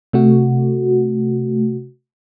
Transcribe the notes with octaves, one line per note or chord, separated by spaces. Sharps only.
C3 A3 F#4